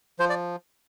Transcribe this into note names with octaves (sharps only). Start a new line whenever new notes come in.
F3 C5
D5